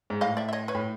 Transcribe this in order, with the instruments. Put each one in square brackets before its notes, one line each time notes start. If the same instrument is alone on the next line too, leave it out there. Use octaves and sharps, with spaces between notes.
[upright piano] G#2
[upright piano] A2 [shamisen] D#5 F5
[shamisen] D5 E5
E5
C#5 D#5
B4 C#5
[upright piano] A2